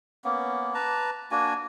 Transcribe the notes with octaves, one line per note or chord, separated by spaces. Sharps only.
A#3 B3 C#4
B4 A5 A#5
A#3 D4 F#4 G#5